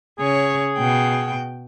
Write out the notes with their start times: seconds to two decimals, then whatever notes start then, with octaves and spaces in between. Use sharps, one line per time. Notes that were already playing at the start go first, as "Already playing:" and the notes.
0.19 C#3 G#4 C#5
0.78 B2 G5